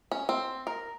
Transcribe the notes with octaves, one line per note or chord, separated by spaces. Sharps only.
C#4
C4
A#4